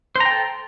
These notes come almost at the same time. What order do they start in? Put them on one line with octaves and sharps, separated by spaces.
C5 A#5 G5 A4